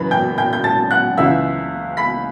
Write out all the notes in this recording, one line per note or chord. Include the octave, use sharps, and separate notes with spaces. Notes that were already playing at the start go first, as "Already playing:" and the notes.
Already playing: F#2 C#3 E3 B4 B5
G5 G6
G5 G6
G6
A5 A6
F#5 F#6
C#2 C#3 E3 E5 E6
B5 B6